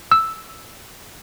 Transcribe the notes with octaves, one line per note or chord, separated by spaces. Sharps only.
E6